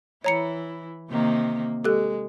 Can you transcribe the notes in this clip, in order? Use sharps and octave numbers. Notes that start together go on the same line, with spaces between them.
E3 E4 C#5 A#5 C#7
C3 D#3 A#3
G#3 G4 A4 F#6